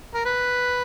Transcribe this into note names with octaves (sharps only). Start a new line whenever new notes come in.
A#4
B4